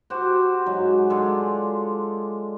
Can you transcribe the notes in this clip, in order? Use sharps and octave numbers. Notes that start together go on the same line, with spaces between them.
F#4 G4 C5
G#2 F#3
G#3 D4 F4 A4